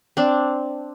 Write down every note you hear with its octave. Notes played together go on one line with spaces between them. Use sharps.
C4 D4